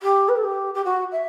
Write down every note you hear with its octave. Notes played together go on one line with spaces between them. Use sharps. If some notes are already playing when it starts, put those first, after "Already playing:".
G4
B4
A4
G4
G4
F#4
E5